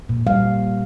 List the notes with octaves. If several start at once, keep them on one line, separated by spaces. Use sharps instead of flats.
A#2
G3 F5